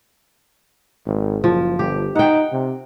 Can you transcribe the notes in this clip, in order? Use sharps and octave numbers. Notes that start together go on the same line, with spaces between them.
G#1
F#1 F3
G1 G4
D#4 F#5 G5
C3